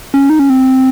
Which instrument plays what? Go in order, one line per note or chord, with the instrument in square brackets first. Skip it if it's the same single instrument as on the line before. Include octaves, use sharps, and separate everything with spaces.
[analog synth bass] C#4
D#4
C#4
C4